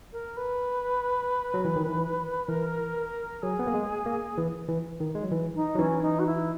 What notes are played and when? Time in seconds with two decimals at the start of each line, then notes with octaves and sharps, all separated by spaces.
0.12 A#4
0.37 B4
1.54 F#3
1.65 E3
1.76 D#3
1.87 E3
2.48 E3 A#4
3.42 F#3 G#4
3.59 B3
3.67 A#3
3.74 G#3
4.06 A#3
4.37 E3
4.68 E3
5.00 D#3
5.15 G#3
5.23 F#3
5.31 E3
5.55 D#4
5.75 F#3
5.78 E3 C#4
6.02 D#4
6.19 F#4
6.26 E4